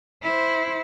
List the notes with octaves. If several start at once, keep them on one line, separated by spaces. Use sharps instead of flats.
E4 C5